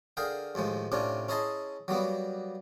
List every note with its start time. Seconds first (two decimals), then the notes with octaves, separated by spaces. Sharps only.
0.17 D3 G#4 A#4 F5 G5
0.55 D#2 A2 F3 G#3
0.92 A2 C3 C#4 D4 F4
1.28 C#4 E4 G#4 D#5 A5 C6
1.88 F#3 G3 A#3 B3